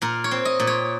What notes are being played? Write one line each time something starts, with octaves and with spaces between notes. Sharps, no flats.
A#2 A#4
C#5
C4
D#5
A#2
C#5